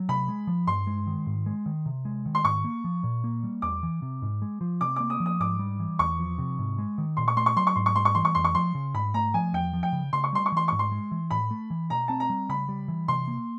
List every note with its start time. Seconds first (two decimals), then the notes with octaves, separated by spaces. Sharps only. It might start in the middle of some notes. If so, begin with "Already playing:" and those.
Already playing: F#3
0.09 C3 B5
0.28 G#3
0.47 F3
0.67 G2 C6
0.87 G#3
1.07 D#3
1.26 G#2
1.46 G#3
1.66 D#3
1.86 C3
2.05 G#3
2.26 D#3
2.35 C6
2.44 G#2 C#6
2.64 A#3
2.84 F3
3.04 A#2
3.24 A#3
3.43 G3
3.62 E2 D6
3.83 E3
4.02 C3
4.22 G#2
4.42 G#3
4.61 F3
4.81 C3 D6
4.96 A#3 D6
5.10 D#6
5.20 F3
5.26 D#6
5.40 G#2 D6
5.59 G3
5.80 E3
5.99 E2 C#6
6.19 F3
6.38 C3
6.59 G#2
6.78 G#3
6.98 D#3
7.17 A#2 C6
7.28 C#6
7.37 A3 C6
7.46 C#6
7.56 F#3 C6
7.67 C#6
7.76 G#2 C6
7.86 C#6
7.96 G3 C6
8.05 C#6
8.15 E3 C6
8.25 C#6
8.35 F2 C6
8.44 C#6
8.55 F3 C6
8.75 C#3
8.94 G#2 B5
9.14 A3 A#5
9.34 F3 G#5
9.53 E2 G5
9.73 F3
9.83 G5
9.92 C#3
10.13 C#3 C6
10.24 C#6
10.33 G3 C6
10.46 C#6
10.52 E3 C6
10.68 G#2 C#6
10.79 C6
10.92 G#3
11.11 E3
11.31 A2 B5
11.51 A3
11.70 E3
11.90 B2 A#5
12.08 C4 A5
12.20 A#5
12.30 G3
12.49 C#3 B5
12.69 G3
12.88 E3
13.08 C3 C6
13.28 A#3